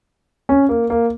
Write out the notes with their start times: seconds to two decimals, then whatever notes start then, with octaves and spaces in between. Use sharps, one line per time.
0.49 C#4
0.69 A#3
0.90 A#3